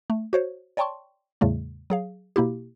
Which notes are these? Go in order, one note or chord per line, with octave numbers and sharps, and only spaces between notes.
A3
F#4 C5 C#5
C#5 D5 G5 A5 C6 C#6
E2 A2 C#3 G3 A3
F#3 G#4 F5
B2 A#3 E4 G4